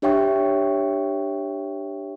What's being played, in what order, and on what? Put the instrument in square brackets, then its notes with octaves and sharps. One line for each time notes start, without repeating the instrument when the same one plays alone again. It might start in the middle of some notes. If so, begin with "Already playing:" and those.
[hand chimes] D4 G4 C#5 E5 G5 C#6